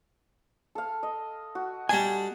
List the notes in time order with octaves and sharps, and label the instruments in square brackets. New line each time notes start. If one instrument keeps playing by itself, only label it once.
[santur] A4 F5
D#5
F#4
[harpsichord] G3 D4 [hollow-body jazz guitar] G#5